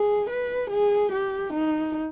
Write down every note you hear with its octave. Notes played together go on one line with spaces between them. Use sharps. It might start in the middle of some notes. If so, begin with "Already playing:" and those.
Already playing: G#4
B4
G#4
G4
D#4